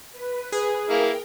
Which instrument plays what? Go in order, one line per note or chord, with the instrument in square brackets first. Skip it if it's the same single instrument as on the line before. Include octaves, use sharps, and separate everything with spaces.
[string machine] B4
[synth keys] G#4
[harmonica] A#3 E4 F5 [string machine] A#4 G5